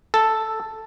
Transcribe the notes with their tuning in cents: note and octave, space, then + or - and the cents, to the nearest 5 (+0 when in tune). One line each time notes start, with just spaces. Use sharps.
A4 +0